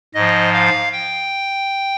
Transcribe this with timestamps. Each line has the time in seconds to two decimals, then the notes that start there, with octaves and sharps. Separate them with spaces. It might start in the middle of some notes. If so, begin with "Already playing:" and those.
0.15 G#2 F3 D#5
0.53 F5
0.92 G5